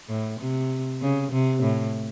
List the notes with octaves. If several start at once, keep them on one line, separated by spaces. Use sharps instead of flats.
A2
C3
C#3
C3
A2